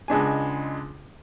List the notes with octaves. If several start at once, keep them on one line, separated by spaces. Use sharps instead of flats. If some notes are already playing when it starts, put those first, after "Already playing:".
C#2 G#3 D4 G#5